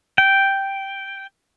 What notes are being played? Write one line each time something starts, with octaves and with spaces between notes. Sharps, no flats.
G5